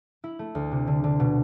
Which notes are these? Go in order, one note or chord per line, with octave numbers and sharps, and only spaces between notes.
E4
A3
D2
C3
D3
D3
B2